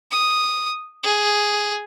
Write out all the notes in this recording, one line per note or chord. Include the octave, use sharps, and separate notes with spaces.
D#6
G#4